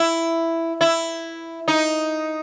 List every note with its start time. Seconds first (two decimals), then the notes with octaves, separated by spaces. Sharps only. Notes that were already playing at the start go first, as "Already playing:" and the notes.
Already playing: E4
0.81 E4
1.68 D#4